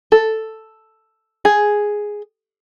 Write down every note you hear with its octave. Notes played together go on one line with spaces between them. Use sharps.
A4
G#4